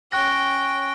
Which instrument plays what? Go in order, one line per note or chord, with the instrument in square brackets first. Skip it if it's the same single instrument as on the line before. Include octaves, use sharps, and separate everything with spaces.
[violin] C#4 G5 [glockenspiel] C#6 F#6 A#6